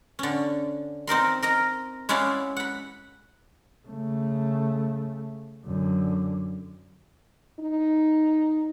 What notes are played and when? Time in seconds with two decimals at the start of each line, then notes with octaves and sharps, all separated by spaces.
0.19 D3 C#4
1.07 C4 D#4 A#4 C6
1.42 A#4 D#5 A#5
2.09 G#3 C#4 E4 D5 F5 F#5
2.56 F#5 B5
3.88 C#3 A3
5.65 F#2 D3
7.60 D#4